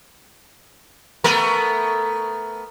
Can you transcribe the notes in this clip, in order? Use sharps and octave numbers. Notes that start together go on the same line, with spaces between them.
A3 B3 A#4